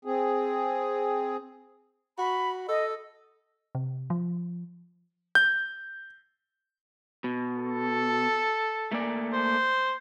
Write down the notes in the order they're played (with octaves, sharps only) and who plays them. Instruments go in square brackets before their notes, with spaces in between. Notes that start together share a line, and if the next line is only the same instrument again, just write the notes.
[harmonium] C4 G#4
[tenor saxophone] F#4 [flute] B5
[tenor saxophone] A4 [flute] D#5
[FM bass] C3
F3
[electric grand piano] G6
[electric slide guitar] B2
[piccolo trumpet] A4
[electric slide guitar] A3 A#3 D5
[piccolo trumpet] C5